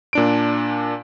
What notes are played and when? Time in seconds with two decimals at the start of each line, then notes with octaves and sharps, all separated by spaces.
0.13 A#2 D4 D7